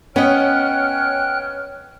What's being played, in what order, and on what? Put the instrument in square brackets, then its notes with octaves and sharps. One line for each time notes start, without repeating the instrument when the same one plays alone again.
[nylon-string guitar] B3 D#5 [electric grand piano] C#4 [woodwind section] C#5 F6 [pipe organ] G5 F#6